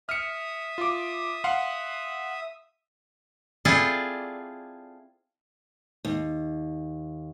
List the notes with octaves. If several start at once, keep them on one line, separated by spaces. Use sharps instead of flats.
E5 D#6 F6 C#7
F4 D6
F5 F#5 C6
C4 E4 F4 G#4 A4 D5
D#2